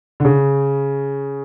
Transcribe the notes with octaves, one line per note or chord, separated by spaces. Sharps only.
D3
C#3